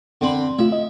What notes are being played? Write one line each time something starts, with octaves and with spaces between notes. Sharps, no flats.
D3 C4 B5
A3 F4 E5
D#5